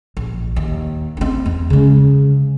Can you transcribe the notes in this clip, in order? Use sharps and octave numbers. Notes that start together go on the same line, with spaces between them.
A#1
D#2
C4 D4
E2
C#3 G#3